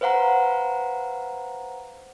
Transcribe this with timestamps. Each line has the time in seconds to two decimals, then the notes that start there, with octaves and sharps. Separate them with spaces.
0.01 B4 C5 F5 F#5 A#5